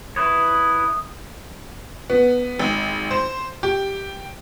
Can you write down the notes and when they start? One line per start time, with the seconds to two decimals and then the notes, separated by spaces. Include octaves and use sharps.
0.16 E4 B4 C#5 D#6
2.10 B3
2.59 G#1
3.11 C5
3.63 G4